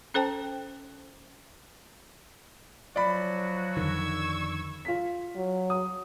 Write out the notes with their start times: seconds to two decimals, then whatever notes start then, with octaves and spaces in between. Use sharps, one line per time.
0.14 C#4 A4 C5 G5 A5
2.96 F3 F#3 F#4 D5 B5
3.77 F2 D3 D#3 C#6 E6 G#6
4.85 F4 B6
5.36 F#3
5.70 D#6